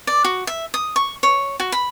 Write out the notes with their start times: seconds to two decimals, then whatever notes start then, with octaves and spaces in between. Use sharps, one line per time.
0.07 D5
0.24 F#4
0.47 E5
0.74 D#6
0.96 C#6
1.23 C#5
1.60 F#4
1.72 B5